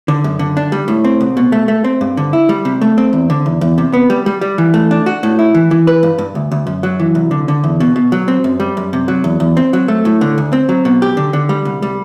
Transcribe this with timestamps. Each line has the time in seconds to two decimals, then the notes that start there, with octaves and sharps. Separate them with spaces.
0.08 D3
0.24 F#2
0.39 D3
0.57 D4
0.72 G3
0.88 A2
1.05 C4
1.20 C2
1.37 B2
1.52 A3
1.68 A3
1.84 C4
2.01 G2
2.17 D3
2.33 E4
2.49 G3
2.65 C3
2.81 A3
2.98 C4
3.13 E2
3.30 D3
3.46 E2
3.61 E2
3.78 C3
3.93 B3
4.10 G3
4.26 G3
4.41 G3
4.58 E3
4.74 A3
4.91 D4
5.06 F#4
5.23 A2
5.39 E4
5.54 E3
5.71 E3
5.87 B4
6.03 G2
6.18 G2
6.35 D2
6.52 D2
6.67 F#2
6.83 F#3
7.00 E3
7.15 C2
7.31 D3
7.48 D3
7.64 E2
7.80 B2
7.96 B2
8.12 F#3
8.28 C4
8.44 F#2
8.60 G3
8.77 F#2
8.93 C3
9.08 F#3
9.24 E2
9.40 E2
9.57 C4
9.73 F#3
9.88 A3
10.05 A2
10.21 D3
10.38 D2
10.53 C4
10.69 F#3
10.85 B2
11.02 G4
11.17 D3
11.33 D3
11.49 G3
11.65 C2
11.82 G3